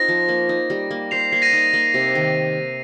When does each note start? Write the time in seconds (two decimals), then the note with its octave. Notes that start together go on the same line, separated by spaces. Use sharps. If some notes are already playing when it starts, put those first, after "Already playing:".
Already playing: C4 D#4 F4 A#6
0.08 F3
0.28 A#3
0.49 D#4
0.70 G3
0.91 A#3
1.11 C5 C7 F7
1.32 A#3 C7
1.42 A#6 D#7
1.53 D#4
1.73 A#3 A#6
1.94 C3
2.15 D#3